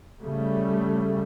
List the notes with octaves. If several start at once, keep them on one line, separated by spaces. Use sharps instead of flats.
C#3 G3 A3